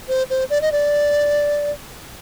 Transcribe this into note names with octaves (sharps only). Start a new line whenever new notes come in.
C5
C5
D5
D#5
D5